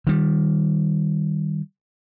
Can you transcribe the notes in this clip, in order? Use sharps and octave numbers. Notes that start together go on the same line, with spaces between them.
D#3 G3